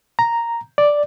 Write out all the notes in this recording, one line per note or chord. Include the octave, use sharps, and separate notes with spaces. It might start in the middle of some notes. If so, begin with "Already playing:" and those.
A#5
D5